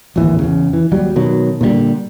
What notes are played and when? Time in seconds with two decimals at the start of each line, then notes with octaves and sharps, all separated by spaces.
0.16 D1 G#1 D#2 E3
0.39 E2 C#3
0.73 E3
0.92 D#2 F#3 G3
1.16 B2 D#3 F#3
1.61 A#2 D3 D#3 G3